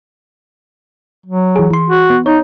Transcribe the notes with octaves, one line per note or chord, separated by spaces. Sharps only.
F#3
E3 G#4
E3 C6
F#4
B3
D#4 C#5